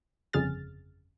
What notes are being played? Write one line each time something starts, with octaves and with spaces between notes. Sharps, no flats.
G1 F2 C#3 G#4 F6 A6